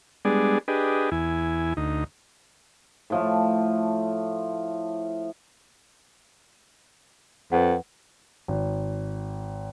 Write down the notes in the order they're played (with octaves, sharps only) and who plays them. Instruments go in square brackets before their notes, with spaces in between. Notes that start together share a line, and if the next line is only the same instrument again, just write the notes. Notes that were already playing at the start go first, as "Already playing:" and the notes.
[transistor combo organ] G3 G#3 B3 D4 G#4 D5
D4 G4 G#4 B4 D#5
E2 E4 G#5
D2 D#4
[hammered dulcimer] A2 F3 A3
[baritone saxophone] F2 [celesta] B4 F#5
[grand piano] G#1